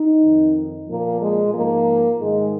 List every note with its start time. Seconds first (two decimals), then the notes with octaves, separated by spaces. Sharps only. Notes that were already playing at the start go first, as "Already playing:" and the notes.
Already playing: D#4
0.22 F2 D#3
0.87 A#2 F3 A#3
1.21 G#3
1.54 G#2 F3 A#3
2.20 G#2 D#3 G#3